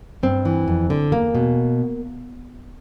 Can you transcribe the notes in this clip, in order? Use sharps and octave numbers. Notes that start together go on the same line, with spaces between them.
G2 C4
E3
F2
D3
E2 A#3
B2